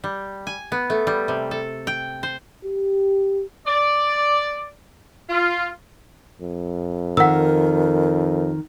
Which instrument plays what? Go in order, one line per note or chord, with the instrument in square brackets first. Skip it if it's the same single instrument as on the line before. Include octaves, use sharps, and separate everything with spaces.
[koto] G3
G#5
B3
A3
G3
C3
A4
G5
C5
[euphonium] G4
[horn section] D5
F4
[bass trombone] F2
[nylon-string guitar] D#3 [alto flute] A#4 [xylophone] F#5 E6